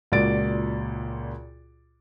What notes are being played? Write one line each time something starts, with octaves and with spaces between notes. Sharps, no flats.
C#2 A#2 F#4 D5 A6 D7